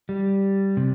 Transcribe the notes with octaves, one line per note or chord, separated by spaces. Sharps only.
G3
C3